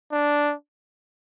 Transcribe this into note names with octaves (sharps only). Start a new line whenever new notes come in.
D4